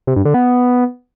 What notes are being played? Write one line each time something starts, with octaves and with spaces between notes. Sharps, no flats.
C3
G2
D3
B3